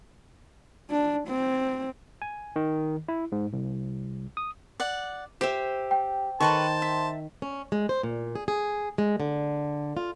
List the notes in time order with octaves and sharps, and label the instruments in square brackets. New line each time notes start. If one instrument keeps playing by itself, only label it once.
[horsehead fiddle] D4
C4
[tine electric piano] G#5
D#3
E4
G#2
C2
D#6
[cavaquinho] D5 F#5
[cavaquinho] G4 [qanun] C5 E5
[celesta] G5
[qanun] D#3 [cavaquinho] A4 B4 C#6 [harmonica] C5 A5
[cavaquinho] E5
[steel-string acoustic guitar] C#4
G#3
C5
A#2
G#4
G#4
G#3
D3
F4